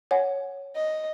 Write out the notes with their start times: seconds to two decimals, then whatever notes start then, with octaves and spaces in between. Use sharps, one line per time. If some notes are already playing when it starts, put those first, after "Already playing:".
0.11 C#5 F#5 G#5
0.75 D#5